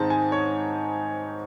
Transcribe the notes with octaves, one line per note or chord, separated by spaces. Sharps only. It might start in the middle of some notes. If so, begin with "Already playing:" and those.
Already playing: G#2 D#3 G#3 C4 D#4 A5
G#5
C#5